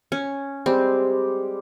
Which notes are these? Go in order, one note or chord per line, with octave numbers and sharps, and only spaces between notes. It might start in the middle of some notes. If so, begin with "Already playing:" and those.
C#4
G3 G#3 C4 G4